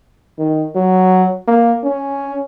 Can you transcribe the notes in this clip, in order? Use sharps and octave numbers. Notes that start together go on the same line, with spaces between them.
D#3
F#3
A#3
C#4